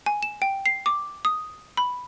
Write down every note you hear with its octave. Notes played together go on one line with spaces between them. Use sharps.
G#5
E7
G5
C7
D6
D#6
B5